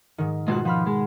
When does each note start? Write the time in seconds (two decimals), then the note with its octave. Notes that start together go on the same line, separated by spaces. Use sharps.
0.18 G#2 D#3
0.48 B2 G#3 F4 F#4 F#6
0.65 F3 F#4 B5 F6
0.86 G#3